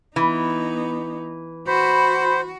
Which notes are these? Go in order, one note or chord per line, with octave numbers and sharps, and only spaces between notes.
E3 B3 D#4
F#4 C5 B5